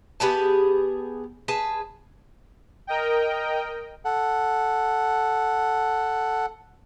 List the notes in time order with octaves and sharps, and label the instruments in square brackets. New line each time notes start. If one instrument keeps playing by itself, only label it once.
[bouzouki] B3 G4 G#4 A5
G#4 B4 A5
[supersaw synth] A#4 D#5 G5
[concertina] A4 F#5